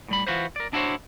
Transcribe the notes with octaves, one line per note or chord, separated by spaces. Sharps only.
A2 G3 B5
E3 F4 F#4 B4 C5
A#4 D5
D4 E4 F#4 G#4 C5 C#5